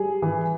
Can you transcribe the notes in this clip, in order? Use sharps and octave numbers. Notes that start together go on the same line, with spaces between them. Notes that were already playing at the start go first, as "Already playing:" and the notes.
Already playing: G3 G#4
E3